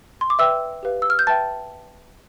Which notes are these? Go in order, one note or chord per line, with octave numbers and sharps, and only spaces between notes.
C6
D6
B4 D5 E5 G5 E6
G4 B4 F5
E6
F6
G6
B4 E5 G5 A5 A6